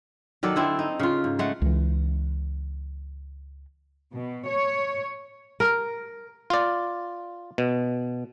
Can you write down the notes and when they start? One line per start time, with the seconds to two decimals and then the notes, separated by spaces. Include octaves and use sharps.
0.43 D#3 F#3 A4 D5
0.56 D3 C4 E4
0.79 D#4
0.99 C#3 F4
1.24 G#2
1.39 G#3 A3 F#5
1.62 C#2 E3
4.14 B2
4.48 C#5
5.60 A#4
6.50 F4 D5
7.58 B2